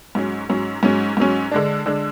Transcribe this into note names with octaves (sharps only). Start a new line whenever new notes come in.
G#2 F#3 C#4
G#2 F#3 C#4
G#2 F#3 C#4
G#2 F#3 C#4
D3 G#3 D4
D3 G#3 D4